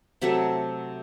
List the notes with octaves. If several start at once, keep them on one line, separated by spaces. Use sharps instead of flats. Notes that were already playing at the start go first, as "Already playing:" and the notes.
C3 F#3 A3 E5